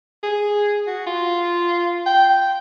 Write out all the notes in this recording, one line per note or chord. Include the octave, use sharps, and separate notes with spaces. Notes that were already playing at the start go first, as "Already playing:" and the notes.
G#4
F#4
F4
G5